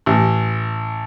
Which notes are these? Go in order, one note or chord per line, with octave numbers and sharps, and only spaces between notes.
A1